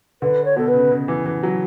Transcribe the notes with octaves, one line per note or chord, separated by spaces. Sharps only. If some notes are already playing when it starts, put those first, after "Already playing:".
D3 B4
C#5
B2 A4
B4
C#3
C#3
E3
E3
F#3